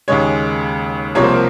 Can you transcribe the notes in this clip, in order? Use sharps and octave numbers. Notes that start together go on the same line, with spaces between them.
D#2 C#3 G#3 C#5
C2 C3 F3 A#3 C#5
C5
A#4